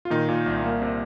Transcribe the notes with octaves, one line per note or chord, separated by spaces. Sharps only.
F4
A#2 D#3 D#4
A#2
C2
A#3
C3